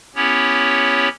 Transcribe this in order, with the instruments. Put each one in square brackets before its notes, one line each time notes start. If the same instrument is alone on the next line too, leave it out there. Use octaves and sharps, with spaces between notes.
[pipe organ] B3 C#4 E4 G4 C#5